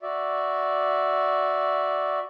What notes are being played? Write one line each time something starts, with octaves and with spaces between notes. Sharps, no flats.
F#4 D5 E5